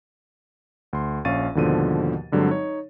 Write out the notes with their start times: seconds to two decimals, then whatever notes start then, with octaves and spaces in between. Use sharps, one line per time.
0.93 D2 C6
1.25 A#1 C#4 F5 C#6 A6 D#7
1.55 D#2 G#2 B2 D3 F3 D#7
2.32 G2 D3 F#3 G#3 C4
2.49 D#4 C#5